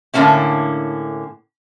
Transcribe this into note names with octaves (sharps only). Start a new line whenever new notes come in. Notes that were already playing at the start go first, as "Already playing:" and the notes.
A2 D3 D#3 A#3 C#4 E4